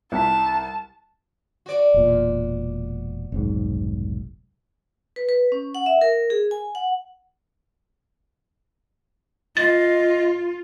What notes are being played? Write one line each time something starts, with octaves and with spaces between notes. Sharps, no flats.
C2 A5 B6
F#4 D5
E1 A#2
F1 B1 G#2
B4
B4
C#4
F#5
E5
A#4
G#4
G#5
F#5
F4 D#5 A6